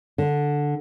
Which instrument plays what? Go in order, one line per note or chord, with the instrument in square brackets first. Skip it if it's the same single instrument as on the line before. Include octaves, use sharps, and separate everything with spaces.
[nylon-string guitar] D3